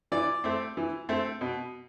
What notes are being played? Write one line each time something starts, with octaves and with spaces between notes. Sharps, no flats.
E3 D5
A3 C4
E3
A3 C4
B2